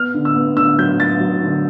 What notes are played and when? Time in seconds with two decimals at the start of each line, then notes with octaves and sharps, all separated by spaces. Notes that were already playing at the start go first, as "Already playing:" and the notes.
Already playing: B3 F6
0.14 D3
0.25 E6
0.36 B3
0.57 D3 E6
0.79 F#3 G6
0.99 F#3 A6
1.20 F#3
1.42 D3